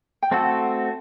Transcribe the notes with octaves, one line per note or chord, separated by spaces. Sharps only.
G5
A3 C4 F#4 A4 F#5 A5